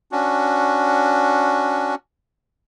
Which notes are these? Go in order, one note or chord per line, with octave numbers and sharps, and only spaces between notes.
C#4 D4 F#4